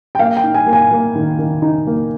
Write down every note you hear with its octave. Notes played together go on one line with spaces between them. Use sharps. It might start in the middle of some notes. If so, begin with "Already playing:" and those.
G5
A#3 F5
G5
D#4
G#5
A#3
G#5
A#3
D#3
D#3
D#4
A#3